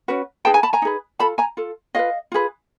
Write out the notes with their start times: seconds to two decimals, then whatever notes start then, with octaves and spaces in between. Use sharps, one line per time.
0.08 C#4 F#4 B4
0.45 D#4 G#4 B4 G5 A5
0.54 G#5 A#5
0.63 A5 B5
0.73 G#5 A#5
0.82 D#4 G#4 B4
1.19 F4 A4 A5 B5
1.38 G#5 A#5
1.57 F4 A4
1.95 F4 G#4 D#5 F5
1.99 B4
2.32 F4 G#4 B4